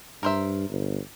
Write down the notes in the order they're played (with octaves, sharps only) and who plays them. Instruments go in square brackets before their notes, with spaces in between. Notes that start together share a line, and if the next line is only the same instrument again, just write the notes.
[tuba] G2 [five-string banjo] A#4 C5 E5
[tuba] G1